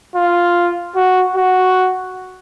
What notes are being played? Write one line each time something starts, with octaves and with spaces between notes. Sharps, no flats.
F4
F#4
F#4